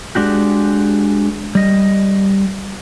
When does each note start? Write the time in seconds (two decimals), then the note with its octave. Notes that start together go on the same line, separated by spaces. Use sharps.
0.15 G#3 D4 F#4 G4
1.55 G3 D#5